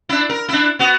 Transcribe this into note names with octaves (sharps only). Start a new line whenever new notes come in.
D4 E4
A#4
D4 E4
B3 F#4